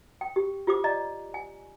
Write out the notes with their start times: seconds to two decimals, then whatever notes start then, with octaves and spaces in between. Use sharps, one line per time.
0.21 G5
0.36 G4
0.67 F4 G4 C5 D6
0.84 D5 D#5 A#5
1.34 G#5